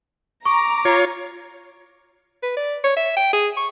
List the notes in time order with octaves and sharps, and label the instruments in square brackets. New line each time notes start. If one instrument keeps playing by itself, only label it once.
[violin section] A#5 [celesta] C#6 [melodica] D6
[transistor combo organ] F4 C#5
[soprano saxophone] B4
D5
C#5
E5
G5
G#4
C#6